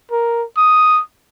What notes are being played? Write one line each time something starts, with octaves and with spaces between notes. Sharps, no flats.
A#4
D#6